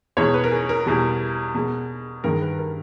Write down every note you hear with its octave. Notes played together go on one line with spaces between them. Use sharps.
E2 B2 G#3 C#5
B4
A#4
G#4
A#4
E2 B2 G3
B2 G#3
G2 D#3 G#3 A#4
B4
A#4